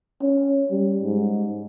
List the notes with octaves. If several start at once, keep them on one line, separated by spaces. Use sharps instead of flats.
C#4
G3
G#2